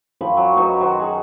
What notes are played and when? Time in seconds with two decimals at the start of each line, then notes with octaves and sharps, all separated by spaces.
0.21 F#2 F3 G5 B5
0.37 F#3
0.57 F#3 D#4 F#4 B4
0.80 D#3 F#4 C5
1.00 G#4